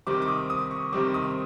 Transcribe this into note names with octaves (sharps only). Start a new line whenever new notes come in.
C3 D#3 G3 C4 D6
D6
D#6
D#6
C#6
C3 D#3 G3 C4 D6
D#6